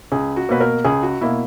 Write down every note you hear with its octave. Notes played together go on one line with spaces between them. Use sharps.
C#2 G#4
F#4
B2 A#3 B4
A#4
C#2 G#4
F#4
B2 A#3 E4